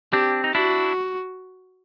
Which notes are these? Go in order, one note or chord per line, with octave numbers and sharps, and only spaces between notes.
C4 D4 G4
D#4
D4 E4 F#4